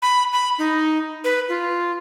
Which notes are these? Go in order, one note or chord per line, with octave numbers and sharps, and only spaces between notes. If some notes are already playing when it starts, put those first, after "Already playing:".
B5
B5
D#4
B4
F4